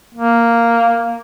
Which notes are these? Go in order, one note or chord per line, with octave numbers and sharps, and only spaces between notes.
A#3